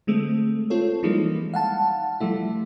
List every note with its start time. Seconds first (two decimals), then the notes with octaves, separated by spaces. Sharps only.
0.07 D3 G#3 A3 C4
0.70 C4 F4 A4 C#5
1.03 E3 F3 G3 G#3 A#3 D#4
1.54 F5 F#5 A5
2.20 F3 G3 A3 E4